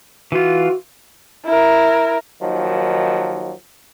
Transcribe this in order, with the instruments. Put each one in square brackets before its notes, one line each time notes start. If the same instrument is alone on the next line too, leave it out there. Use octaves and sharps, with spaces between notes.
[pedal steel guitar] E3 F4 [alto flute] F#4
[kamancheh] E4 A#4
[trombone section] D#2 D#3 F3 F#3